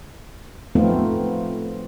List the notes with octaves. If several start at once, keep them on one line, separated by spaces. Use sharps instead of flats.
F3 A3 B3 C4 D#4 F4